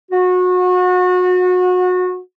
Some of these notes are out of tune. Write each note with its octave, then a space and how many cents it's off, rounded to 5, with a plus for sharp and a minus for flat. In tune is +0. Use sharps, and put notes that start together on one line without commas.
F#4 -30